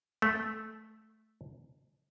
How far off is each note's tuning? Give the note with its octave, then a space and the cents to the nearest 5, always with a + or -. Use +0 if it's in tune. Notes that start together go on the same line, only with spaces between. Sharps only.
A3 -10